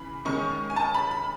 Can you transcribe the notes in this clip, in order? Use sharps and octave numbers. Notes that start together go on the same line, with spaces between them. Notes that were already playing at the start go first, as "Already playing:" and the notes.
Already playing: C#3 E3 B5
D#3 G#3 C#4 C#6
G#5
A5
B5
B5